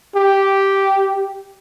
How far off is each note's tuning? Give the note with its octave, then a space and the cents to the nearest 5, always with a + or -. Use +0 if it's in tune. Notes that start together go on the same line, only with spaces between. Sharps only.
G4 -5